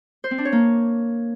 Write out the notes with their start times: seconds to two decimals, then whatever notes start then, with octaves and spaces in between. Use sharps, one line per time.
0.24 C5
0.31 C4
0.38 D4
0.45 C#5
0.52 A#3